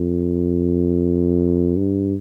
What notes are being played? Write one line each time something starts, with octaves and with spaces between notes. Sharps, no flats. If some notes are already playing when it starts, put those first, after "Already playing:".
Already playing: F2
G2